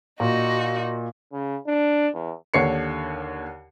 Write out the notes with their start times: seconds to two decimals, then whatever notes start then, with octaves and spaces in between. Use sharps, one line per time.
0.20 A#2 D#4 F#4
1.33 C#3
1.66 D4
2.14 E2
2.54 D#2 D3 C#5 C7 C#7